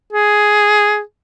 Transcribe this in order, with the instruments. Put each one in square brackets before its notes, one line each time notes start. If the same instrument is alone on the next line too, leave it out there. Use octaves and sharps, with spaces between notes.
[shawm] G#4